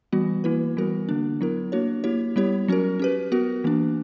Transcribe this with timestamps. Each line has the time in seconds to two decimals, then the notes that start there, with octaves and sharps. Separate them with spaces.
0.12 E3 G3 B3 F#4
0.44 E3 A#3 E4 B4
0.77 E3 G3 B3 F#4 A#4
1.09 D3 A#3 D4
1.41 F#3 B3 E4 A#4
1.72 A#3 D4 F#4 C#5
2.04 A#3 E4 G4 C#5
2.36 G3 B3 E4 G4 C#5
2.68 F#3 C#4 F#4 A#4
2.99 C#4 G4 B4
3.32 B3 F#4 A#4
3.64 E3 A#3 D4